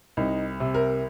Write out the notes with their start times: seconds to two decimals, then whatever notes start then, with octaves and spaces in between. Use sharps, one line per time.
0.17 C2 D#4
0.60 C3
0.74 A#4